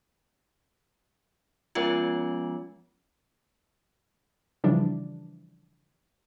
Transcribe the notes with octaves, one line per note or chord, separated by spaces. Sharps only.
F3 G#3 B3 C#4 F4
C#3 E3 F3 G3 D4